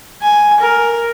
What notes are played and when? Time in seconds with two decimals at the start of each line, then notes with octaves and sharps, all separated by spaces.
0.22 G#5
0.61 A#4